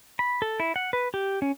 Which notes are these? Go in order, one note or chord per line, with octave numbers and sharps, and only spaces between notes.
B5
A4
E4
F#5
B4
G4
C#4